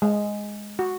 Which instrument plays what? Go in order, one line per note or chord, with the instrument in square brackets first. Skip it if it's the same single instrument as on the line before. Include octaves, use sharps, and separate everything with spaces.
[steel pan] G#3
F#4